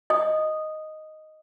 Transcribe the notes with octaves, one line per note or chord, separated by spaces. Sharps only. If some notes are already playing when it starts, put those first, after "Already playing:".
D#5 D#6